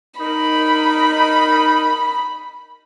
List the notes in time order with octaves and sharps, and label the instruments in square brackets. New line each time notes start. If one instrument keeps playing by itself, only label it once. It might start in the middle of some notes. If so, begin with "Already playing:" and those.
[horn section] D#4 A#4 [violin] B5